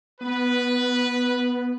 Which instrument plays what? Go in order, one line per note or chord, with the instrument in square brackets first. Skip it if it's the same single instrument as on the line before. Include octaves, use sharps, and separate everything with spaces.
[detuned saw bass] B3 [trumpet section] B4